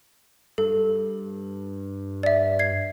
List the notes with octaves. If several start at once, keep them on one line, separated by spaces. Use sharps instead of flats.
G2 A4
D5 E5
G#6 C7